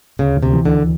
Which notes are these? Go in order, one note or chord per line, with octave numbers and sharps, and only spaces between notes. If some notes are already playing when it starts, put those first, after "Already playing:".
D2 C#3
D2
C3
E3
D3